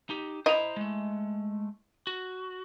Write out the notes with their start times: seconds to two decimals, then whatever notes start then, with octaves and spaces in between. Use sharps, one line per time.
0.10 D#4 G4
0.46 E4 C5 D#5 A#5
0.77 G#3 A3
2.07 F#4